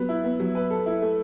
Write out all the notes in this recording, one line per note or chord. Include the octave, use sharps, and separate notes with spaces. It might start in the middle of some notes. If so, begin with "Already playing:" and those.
Already playing: F#3 B3 B4
E4
B3
F#3
B4
A4
E4
A3